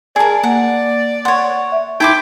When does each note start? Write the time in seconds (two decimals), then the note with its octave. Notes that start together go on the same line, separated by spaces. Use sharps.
0.16 G#4 A#4 D5 G#5 A5
0.44 A#3 F#5
1.25 C#5 F#5 C6
1.72 E5
2.00 D#4 E4 C5 G5 D6